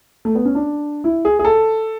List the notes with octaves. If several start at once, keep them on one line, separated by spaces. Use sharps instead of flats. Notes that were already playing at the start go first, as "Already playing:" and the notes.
A3
B3
C#4
D4
E4
G#4
G#4
A4